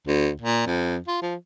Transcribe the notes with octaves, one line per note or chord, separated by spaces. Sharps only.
D2
A#2
F2
F4
F3